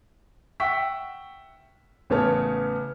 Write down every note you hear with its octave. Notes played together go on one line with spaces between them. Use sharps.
E5 F#5 G5 C#6 E6 B6
A1 C#3 B3 C#5 A5 F6